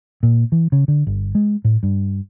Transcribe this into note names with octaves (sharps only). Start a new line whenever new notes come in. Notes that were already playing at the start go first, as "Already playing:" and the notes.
A#2
E3
C#3
D3
G1
G#3
A2
G2